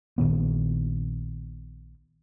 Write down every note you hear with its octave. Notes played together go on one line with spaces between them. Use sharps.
A#1 A#2 D#3 B3